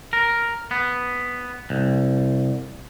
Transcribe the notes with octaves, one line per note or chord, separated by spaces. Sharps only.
A#4
B3
C2